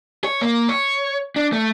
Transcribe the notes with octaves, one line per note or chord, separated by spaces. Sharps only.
C#5
A#3
C#5
D4
A3